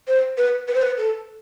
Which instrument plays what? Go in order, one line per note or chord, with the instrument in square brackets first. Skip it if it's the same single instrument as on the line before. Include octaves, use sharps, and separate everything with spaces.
[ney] C5
B4
B4
C5
B4
A4